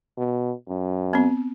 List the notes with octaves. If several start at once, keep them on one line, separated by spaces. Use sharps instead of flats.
B2
F#2
B3 C4